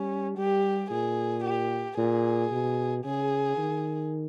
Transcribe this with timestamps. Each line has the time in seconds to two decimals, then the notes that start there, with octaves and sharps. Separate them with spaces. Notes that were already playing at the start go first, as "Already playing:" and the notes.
Already playing: G3 C#4
0.37 G3 G4
0.91 A#2 G#4
1.44 G4
1.97 A#2 G#4
2.51 B2
3.05 C#3 G#4
3.57 D#3